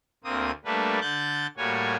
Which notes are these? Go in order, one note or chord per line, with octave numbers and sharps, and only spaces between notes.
D2 A#3 C4 D#6
G3 A3 A#3 D4 B4
D3 F#6 G6 A6
A2 G3 A#3 F#4 C#5 G#5